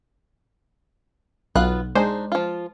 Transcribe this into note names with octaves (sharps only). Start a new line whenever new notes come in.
B1 B3 F4 F#6
G#3 D4 D#4 C5
F3 F4